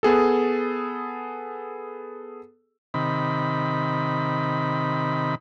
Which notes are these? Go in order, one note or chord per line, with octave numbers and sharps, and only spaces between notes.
B3 G#4 A4
C3 D#3 B5